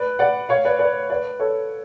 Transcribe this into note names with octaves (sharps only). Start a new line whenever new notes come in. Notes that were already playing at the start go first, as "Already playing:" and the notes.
Already playing: B4 D5
D5 F#5
C#5 F5
B4 D5
B4 D5
B4 D5
A4 C#5